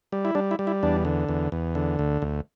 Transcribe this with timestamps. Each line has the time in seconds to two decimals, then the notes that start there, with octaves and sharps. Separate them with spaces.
0.12 G3
0.25 E4
0.35 G3 D4
0.51 E4
0.59 G3
0.67 E4
0.83 E2 D4
1.05 D3
1.29 E2
1.52 E2
1.75 D3
1.99 D2
2.22 D2